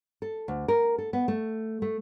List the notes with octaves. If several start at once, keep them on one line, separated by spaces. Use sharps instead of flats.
A4
D2
A#4
A4
B3
A3
A3